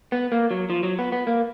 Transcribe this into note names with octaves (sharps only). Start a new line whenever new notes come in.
B3
A#3
F#3
F3
F#3
B3
B3
A#3